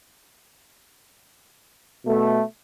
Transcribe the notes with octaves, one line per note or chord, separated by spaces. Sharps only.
B2 A3